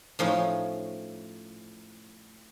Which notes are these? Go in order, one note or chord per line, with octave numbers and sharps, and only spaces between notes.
A2 F3 C#4 D#4